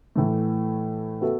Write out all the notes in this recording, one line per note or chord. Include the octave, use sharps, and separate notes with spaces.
A2 E3 A3
B3 F#4 A4 E5